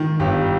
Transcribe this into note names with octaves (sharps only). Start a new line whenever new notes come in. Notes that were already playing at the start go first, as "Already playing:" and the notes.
Already playing: D#3
G1 G4